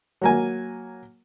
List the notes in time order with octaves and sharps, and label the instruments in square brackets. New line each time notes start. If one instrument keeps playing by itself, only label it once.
[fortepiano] F#3 A#3 G#5